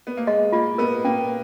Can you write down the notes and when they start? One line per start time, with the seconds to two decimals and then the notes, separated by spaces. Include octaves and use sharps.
0.07 B3
0.17 A#3
0.27 G#3 D#5
0.52 A#3 F4
0.78 B3 A#4
1.05 A#3 C#4